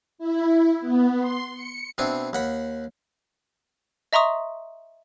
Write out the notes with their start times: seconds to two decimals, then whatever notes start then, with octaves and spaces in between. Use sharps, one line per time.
0.18 E4
0.80 B3
1.20 C6
1.54 C#7
1.98 B2 C4 D4 E4
2.33 D#2 F#5 B5
4.13 D#5 E5 A#5 C6 C#6 D#6